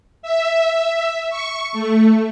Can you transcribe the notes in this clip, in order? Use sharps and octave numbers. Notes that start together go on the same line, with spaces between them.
E5
C#6
A3